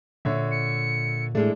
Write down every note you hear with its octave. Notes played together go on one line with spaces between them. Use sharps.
A#2 D3 C#5 E5
C#7
A2 E3 G#3 A3 D4